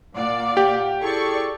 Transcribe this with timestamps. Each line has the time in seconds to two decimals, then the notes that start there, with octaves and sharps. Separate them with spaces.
0.16 A#2 D5 F5 F#5 D6
0.57 G4
1.03 E4 G#4 A4 D5 C#6